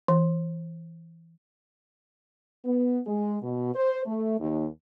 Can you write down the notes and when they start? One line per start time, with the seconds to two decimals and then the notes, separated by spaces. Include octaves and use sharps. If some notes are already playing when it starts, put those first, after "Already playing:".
0.08 E3
2.65 B3
3.07 G#3
3.42 B2
3.75 C5
4.06 A3
4.40 D#2